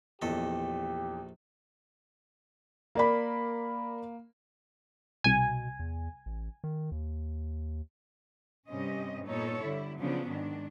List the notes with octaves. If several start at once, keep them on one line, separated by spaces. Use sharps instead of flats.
A#1 E2 G4 A4 D#5
A#3 A#4 D5 B5
C2 B2 G#5
E2
A1
D#3
D#2
G2 C3 G3 C4 C#4 D#5
A#2 B3 D#4 A4 C#5
D3 G3 E4
C#3 F3 F#3 B3 C#4 D4
G#2 D#3 D4